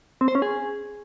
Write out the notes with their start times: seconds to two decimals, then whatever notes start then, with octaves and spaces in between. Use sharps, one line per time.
0.21 C4
0.28 C5
0.35 C#4
0.42 G#4